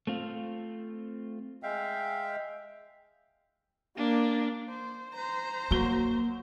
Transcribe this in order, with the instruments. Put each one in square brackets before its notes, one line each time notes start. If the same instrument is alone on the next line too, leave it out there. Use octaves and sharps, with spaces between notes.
[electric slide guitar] A3 C4 F4
[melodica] G#3 E5 F5 G5
[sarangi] A#3 [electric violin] D4
[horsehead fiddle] C5
C5 A#5
[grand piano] F#3 G7 [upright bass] A#3